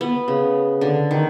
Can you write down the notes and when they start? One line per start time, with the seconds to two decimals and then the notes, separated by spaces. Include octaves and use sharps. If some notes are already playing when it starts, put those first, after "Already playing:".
0.01 B3
0.28 C#3
0.81 D3
1.11 D#3